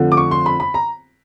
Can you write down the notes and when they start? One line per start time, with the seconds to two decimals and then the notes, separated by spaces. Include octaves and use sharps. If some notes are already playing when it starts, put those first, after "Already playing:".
Already playing: F2 D3 F3 A3
0.12 D6
0.17 C#6
0.31 C6
0.46 B5
0.60 B5
0.74 A#5